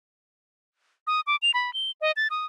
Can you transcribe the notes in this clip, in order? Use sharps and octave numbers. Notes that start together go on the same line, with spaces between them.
D#6
D6
F7
B5
G7
D#5
A6
D#6